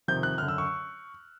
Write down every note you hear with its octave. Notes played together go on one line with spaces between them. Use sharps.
F2 C3 D#3 G6
F#6
F#2 D3 F6
E6
C#6